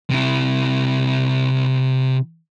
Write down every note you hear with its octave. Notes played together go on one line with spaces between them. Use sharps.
C3 E4